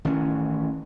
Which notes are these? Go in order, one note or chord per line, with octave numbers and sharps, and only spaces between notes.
A1 D#3 E3 C#4